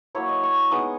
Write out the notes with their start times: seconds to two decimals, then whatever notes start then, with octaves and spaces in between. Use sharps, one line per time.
0.15 F#3 A#3 E4 C#5
0.29 D#5
0.43 C#6
0.71 G#3 B3 D#4 D#6